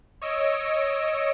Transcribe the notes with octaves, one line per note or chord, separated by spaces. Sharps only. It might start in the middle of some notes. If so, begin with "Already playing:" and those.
C#5 D#5 E6 C#7 D7